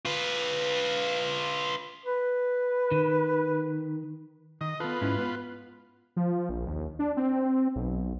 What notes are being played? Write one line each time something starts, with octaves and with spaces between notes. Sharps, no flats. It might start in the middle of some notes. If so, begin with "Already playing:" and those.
F4 B4
B4
D#3
D#3 D#5
B3 F4 A4 B4
G#2 C#4 E4
B3
F3
A#1
D#2
D4
C4
B1